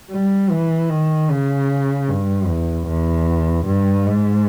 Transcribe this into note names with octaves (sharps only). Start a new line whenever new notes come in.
G3
E3
D#3
C#3
G2
E2
E2
G2
G#2